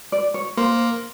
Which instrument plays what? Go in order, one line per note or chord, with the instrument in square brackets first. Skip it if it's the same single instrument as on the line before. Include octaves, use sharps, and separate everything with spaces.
[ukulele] D5
C#5
[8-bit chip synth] A#3 [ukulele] C5